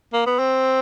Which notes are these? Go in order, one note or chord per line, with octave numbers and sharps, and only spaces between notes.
A#3
B3
C4